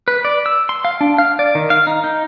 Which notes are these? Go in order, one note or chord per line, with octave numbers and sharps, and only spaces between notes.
B4
D5
E6
C6
F5
D4
F5
D5
D#3
F5
D#4
D#4